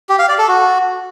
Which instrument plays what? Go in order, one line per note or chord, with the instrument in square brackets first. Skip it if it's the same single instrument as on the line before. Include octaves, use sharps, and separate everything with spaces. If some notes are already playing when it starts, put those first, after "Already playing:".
[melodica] G4
F5
D5
A4
F#4